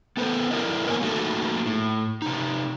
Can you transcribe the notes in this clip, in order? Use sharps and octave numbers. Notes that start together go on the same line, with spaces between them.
B3 A4 B4 C5
E4 A4 A#4 C5 D5 D#5
A#3 B3 A#4 C#5 G#5
A3 A#3 D#4 F#4 G#4 A4
A2
C3 D#4